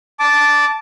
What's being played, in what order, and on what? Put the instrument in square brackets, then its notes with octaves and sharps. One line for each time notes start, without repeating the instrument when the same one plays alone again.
[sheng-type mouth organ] A5 D6